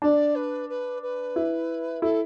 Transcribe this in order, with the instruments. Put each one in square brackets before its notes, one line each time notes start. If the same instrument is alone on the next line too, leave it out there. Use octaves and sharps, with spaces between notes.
[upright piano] D4 [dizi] D5
[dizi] B4
B4
B4
[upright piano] E4
[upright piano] E4 [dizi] A4